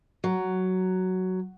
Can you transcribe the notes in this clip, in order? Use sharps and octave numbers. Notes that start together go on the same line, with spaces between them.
F#3